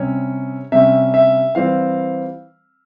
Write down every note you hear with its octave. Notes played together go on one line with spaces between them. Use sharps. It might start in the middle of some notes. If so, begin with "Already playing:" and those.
Already playing: C3 G3 C#4 C#5
C3 G3 C#4 E5
E5
E3 G3 C4 F5